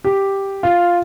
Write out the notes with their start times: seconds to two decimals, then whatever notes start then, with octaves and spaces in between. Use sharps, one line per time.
0.04 G4
0.63 F4